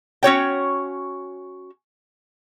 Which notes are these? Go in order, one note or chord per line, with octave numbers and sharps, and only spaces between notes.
C#4 F#4 C#5 G5